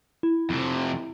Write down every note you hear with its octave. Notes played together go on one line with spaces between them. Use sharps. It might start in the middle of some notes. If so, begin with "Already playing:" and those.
E4
F2 C3